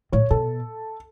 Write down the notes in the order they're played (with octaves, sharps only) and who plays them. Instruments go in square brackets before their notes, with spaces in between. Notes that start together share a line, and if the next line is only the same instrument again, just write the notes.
[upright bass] A2 [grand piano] C#5
[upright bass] B2 [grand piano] A4